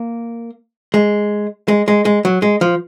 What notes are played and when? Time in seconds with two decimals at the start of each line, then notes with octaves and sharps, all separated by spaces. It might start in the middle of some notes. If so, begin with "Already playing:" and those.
Already playing: A#3
0.94 G#3
1.68 G#3
1.88 G#3
2.05 G#3
2.25 F#3
2.42 G#3
2.61 F3